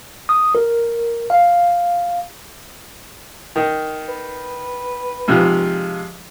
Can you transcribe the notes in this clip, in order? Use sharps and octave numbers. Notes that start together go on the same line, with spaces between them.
D#6
A#4
F5
D#3
B4
G#2 C3 F3